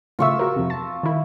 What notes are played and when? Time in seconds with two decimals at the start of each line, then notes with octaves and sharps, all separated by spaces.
0.19 A2 C#3 F4 E5 C#6 E6
0.39 F#4 A#4
0.56 F2 C3
0.70 A5
1.03 D#3 E4